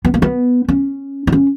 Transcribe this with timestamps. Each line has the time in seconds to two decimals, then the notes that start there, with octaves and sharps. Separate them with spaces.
0.05 B3
0.14 A#3
0.22 B3
0.69 C#4
1.27 D#4
1.32 C#4